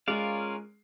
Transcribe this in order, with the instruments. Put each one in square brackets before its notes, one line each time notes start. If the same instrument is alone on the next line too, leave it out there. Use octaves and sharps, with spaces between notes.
[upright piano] G#3 [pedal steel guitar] C#4 F4 A#4 D5 F5